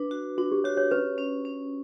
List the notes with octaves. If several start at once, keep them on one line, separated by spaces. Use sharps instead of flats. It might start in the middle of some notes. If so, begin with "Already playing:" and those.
Already playing: D4 B4
F#4
D4 F#4
G4
F#4 C#5
C#5
C#4 B4
C#4
C#4